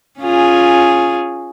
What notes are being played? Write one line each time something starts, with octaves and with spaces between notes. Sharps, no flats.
C#4 F4 G#4